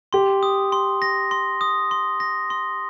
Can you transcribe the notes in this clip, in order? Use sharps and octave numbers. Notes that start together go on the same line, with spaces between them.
G4 C6
D#6
C6
A#6
C6
D#6
C6
A#6
C6